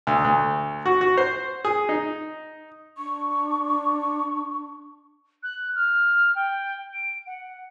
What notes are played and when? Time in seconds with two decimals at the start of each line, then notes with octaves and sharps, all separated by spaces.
0.07 D2
0.24 D2
0.86 F#4
1.01 F#4
1.17 C5
1.65 G#4
1.89 D#4
2.97 D4 C#6
5.43 F#6
5.75 F6
6.35 G5
6.93 D7
7.26 F#5